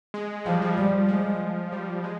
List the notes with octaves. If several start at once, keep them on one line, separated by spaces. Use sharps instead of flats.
G#3
F3 G3
F3
F3 G3
F3 G#3
G3
G#3